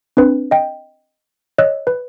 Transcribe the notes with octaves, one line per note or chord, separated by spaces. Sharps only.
C4 D4 B4
D#5 G5
C#5 D#5 E6 F#6
B4